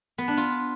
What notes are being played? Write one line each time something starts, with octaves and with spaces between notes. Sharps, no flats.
B3
D4
F4